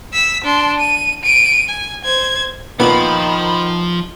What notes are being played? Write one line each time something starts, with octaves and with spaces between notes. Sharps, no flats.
E6 B6
D4 C6
D#7
D7 D#7
G#5
C5 G#6
A#2 D#3 F3 B3 B5